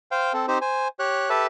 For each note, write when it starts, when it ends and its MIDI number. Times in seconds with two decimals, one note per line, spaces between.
0.11 0.33 72
0.11 0.33 77
0.11 0.33 79
0.34 0.46 60
0.34 0.46 69
0.48 0.58 60
0.48 0.58 63
0.48 0.58 67
0.48 0.58 72
0.62 0.88 72
0.62 0.88 80
0.99 1.29 67
0.99 1.29 73
0.99 1.29 90
1.30 1.47 67
1.30 1.47 69
1.30 1.47 71
1.30 1.47 76
1.30 1.47 81